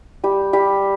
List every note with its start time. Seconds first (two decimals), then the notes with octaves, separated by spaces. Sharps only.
0.24 G3 G4
0.53 G3 G4